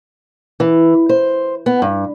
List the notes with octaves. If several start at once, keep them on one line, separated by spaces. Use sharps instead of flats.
E3
C5
B3
G2